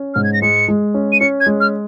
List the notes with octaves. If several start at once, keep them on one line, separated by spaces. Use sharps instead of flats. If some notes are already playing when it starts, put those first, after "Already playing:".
Already playing: C#4
G#2 F6
G#6
A#6
G#3 C#7
G#3
C#4
D#7
C#4 C#7
G#6
G#3
F6